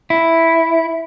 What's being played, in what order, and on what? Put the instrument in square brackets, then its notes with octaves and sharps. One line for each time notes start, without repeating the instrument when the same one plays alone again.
[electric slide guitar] E4